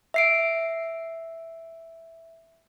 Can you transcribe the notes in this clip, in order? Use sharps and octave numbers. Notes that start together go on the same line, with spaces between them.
E5 C7 D7